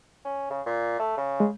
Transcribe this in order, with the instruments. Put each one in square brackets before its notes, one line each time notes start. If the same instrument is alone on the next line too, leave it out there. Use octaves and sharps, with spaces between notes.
[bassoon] C#4
C#3
A#2
A3
C#3
[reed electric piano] G#3